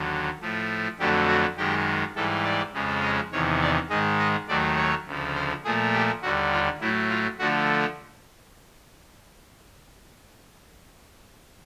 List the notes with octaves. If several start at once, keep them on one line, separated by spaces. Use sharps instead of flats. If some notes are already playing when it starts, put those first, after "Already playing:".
Already playing: D#2 D3 F#3
A2 F3 A3
F2 D3 F#3 A3 G4
F#4
F#2 D#3 G#3 G4
G#2 E3 G3 A4
D5
F2 C#3 F3 G#3
D#5
E2 C3 D#3 C#5
D5
G#2 D#3 G#3 D#5
D#5
D#2 D#3 F#3 A3 D5
C#5
D2 C#3 F3
C5
A#2 F3 A3 G#4
G4
D#2 D3 G3 F#4
F4
A2 F#3 A3 E4
F4
D3 F3 A3 F#4